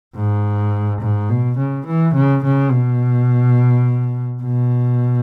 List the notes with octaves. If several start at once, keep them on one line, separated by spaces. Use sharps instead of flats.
G#2
G#2
B2
C#3
E3
C#3
C#3
B2
B2